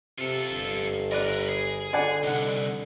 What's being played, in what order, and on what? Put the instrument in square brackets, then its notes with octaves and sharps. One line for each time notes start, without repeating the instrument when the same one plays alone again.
[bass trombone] C3 [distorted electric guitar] F4 A4
[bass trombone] G1
[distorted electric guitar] A#4 B4 [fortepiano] D5 F#6
[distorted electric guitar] G#4
[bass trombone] D3 [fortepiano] D5 F#5 G#5
[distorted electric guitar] C2 [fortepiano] D#4 F#5